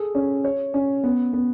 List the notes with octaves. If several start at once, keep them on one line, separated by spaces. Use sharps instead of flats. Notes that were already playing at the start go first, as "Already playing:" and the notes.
Already playing: G#4 A4
C#4
C#5
C#4
B3
B3